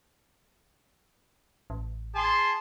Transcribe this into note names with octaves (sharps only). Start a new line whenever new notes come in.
A1
G#4 A5 C6